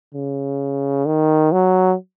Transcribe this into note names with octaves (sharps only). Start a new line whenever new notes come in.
C#3
D#3
F#3